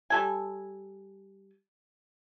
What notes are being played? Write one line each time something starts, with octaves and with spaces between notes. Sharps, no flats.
G3 A4 G#5